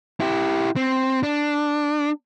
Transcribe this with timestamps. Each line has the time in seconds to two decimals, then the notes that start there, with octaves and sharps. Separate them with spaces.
0.20 E4 G4
0.76 C4
1.23 D4